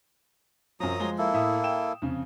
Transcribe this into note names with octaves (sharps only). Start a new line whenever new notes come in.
F#2 F3 F#3 A#5 D#6
F3 G#3 G7
A#3 E4 A4
A2 E5 D#6
G5 E7
F2 C#3